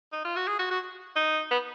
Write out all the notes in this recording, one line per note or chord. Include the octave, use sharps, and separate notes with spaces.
D#4
F4
F#4
G#4
F#4
F#4
D#4
B3